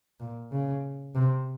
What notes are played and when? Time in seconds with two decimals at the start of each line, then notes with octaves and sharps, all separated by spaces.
0.20 A#2
0.51 C#3
1.15 C3